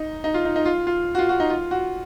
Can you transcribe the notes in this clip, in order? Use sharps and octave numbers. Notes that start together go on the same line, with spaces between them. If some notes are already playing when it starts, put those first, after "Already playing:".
Already playing: D#4
D#4
F4
D#4
D#4
F4
F4
F#4
F4
F#4
D#4
F4
F#4